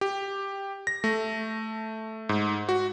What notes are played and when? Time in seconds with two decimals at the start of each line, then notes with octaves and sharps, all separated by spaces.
0.01 G4
0.87 A#6
1.04 A3
2.29 G#2
2.69 F#4